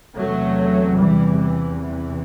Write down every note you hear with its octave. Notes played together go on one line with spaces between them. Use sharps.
E2 C3 F#3 A3
E3 G3
E3
E3